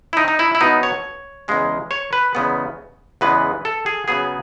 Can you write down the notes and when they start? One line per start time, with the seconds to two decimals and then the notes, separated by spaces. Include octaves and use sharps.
0.13 E4
0.17 D#4
0.28 D#4
0.39 E4
0.55 E4
0.61 B2 F#3 B3 D#4
0.83 C#5
1.48 E2 C#3 G#3 C#4
1.91 C#5
2.13 B4
2.35 E2 C#3 G#3 B3
3.21 E2 C#3 E3 G#3 B3 B4
3.65 A4
3.86 G#4
4.08 C#3 F#3 B3 G#4